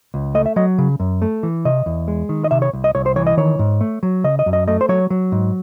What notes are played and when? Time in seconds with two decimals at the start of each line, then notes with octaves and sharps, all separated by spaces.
0.14 C#2
0.35 A3 D#5
0.46 E5
0.56 F#3 D#5
0.78 C#3
1.00 F#2
1.22 A3
1.43 E3
1.65 C3 D#5
1.86 E2
2.08 G#3
2.29 D#3
2.44 D#5
2.51 C3 E5
2.62 C#5
2.73 C2
2.84 D#5
2.95 C2 C#5
3.06 C5
3.16 E3 C#5
3.27 D#5
3.37 D#3 C#5
3.59 G#2
3.81 A3
4.03 F#3
4.24 C#3 D#5
4.39 D#5
4.46 F#2
4.53 D#5
4.68 A3 D#5
4.81 C5
4.89 F#3 C#5
5.10 F#3
5.32 G#2